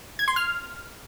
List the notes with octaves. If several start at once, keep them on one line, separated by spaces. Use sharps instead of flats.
G#6
C6
F6